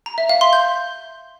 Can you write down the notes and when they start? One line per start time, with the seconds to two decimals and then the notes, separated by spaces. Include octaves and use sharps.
0.06 A#5
0.18 E5
0.29 F5
0.41 C6
0.53 G6